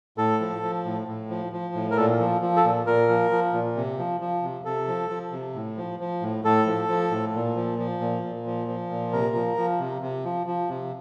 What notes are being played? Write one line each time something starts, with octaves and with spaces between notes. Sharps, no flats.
A2 A4
F3
F3
A2
A2
F3
F3
A2
A#4
A#2 A4
F3
F3
A4
A#2
A#2 A#4
F3
F3
A#2
C3
F3
F3
C3
C3 A4
F3
F3
C3
A2
F3
F3
A2
A2 A4
F3
F3
A2
A#2
F3
F3
A#2
A#2
F3
F3
A#2
C3 A#4
F3
F3
C3
C3
F3
F3
C3